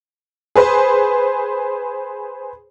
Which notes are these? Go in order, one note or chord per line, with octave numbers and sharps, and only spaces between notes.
G#4 B4 C5